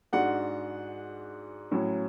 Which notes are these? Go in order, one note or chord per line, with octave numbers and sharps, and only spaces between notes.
G#2 G#3 D4 F#4 F#5
A2 F#3 C#4